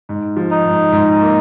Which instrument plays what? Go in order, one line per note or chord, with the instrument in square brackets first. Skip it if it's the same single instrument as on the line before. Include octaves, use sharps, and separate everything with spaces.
[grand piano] G#2
F3
[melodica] D#4
[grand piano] G#2
G#2
A#3